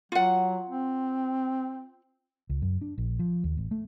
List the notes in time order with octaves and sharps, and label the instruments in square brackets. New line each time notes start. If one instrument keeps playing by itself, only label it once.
[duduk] F#3 [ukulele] F4 F#5
[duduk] C4
[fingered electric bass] C#2
F#2
D4
A#1
F3
D#2
A1
A3